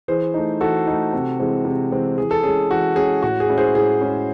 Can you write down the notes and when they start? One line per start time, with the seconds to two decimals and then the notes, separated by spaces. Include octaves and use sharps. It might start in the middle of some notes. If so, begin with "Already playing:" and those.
0.08 E3 G#4 C5
0.34 A3 D#4
0.61 E3 F#4 A4
0.87 A3 D#4
1.13 C3
1.39 E3 G#3 C4
1.65 C3
1.92 E3 G#3 C4
2.18 E3 G#4
2.31 A4
2.43 G#3 C#4 G#4
2.70 E3 F#4
2.96 G#3 C#4 G#4
3.22 A2 F#4
3.40 G#4
3.49 G#3 C#4 E4
3.58 G#4 C5
3.75 A2 G#4
4.01 G#3 C#4 E4